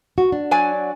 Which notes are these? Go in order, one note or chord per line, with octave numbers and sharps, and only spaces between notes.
F#4
D4
F#3 D5 G#5